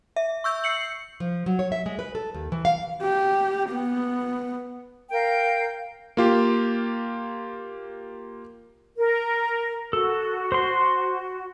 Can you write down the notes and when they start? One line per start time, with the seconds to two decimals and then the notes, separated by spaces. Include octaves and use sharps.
0.16 E5
0.44 C#6 E6 G6
0.64 C7 C#7 F#7
1.20 F3
1.46 F#3
1.59 C#5
1.72 E5
1.86 G#3
1.99 B4
2.15 A4
2.34 D#2
2.52 E3
2.65 F5
3.03 G4
3.70 B3
5.12 A#4 F5 G5 G6
6.17 A#3 F4 G4
8.97 A#4
9.93 F#4 A4
10.52 C5 C6